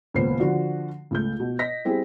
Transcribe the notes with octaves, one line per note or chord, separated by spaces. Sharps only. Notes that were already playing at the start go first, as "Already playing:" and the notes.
D#1 C#2 A#3 B3 C5 C7
D3 F3 F#4
C#2 A3 G6
B2
D#5 A#6 B6
G3 C4 E4 G#4